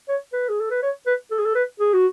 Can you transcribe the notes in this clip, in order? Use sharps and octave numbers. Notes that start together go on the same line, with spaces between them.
C#5
B4
G#4
A4
B4
C#5
B4
A4
G#4
A4
B4
G#4
F#4